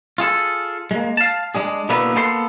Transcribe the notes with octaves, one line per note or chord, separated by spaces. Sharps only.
F4 G#4 A4
G#3 A#3
F5 A5
G#3 D4 G#4
B2 D3 A#3 B3 E4 B4
A#3 B3 A4 G5 C6